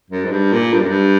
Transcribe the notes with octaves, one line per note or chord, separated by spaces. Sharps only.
F#2
G#2
G2
A#2
G2
F#2
G2